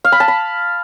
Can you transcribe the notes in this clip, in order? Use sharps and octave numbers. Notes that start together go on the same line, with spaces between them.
F5
B5
A5
B5